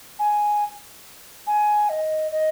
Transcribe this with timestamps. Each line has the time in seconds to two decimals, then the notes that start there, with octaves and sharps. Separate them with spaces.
0.19 G#5
1.47 G#5
1.89 D#5
2.31 D#5